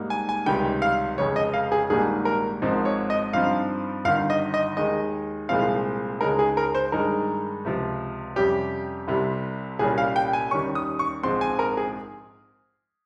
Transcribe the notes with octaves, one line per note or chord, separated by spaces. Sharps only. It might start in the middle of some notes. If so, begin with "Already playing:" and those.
Already playing: G#2 G3 A#3 D#4
G#5
G#5
C#2 C3 D#3 G3 G5
F5
F1 F2 C#3 G#3 C#5
D#5
F5
G#4
A#1 G#2 D#3 G3 A#3 G#4
A#4
G#1 G#2 F3 C4 D#4
C#5
D#5
G2 F3 C4 D#4 F5
G1 G2 D#3 F5
D#5
D#5
D#2 D#3 G#3 D#5
C2 A#2 F3 G#3 C4 F5
C#2 C#3 G#3 D#4 A#4
G#4
A#4
C5
G2 D#3 G#3 D#4 A#4
C#2 C3 F3
F2 C3 G3 C#4 G4
C2 C3 G3
C2 A#2 G3 C#4 G#4
F5
G5
G#5
D#2 D#3 G3 C#4 C#6
D#6
C#6
A#1 G#2 F3 G#3 C4 C6
G#5
A#4
G#4